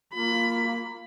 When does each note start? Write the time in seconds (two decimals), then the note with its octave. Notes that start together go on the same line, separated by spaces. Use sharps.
0.15 A#3 F4 B5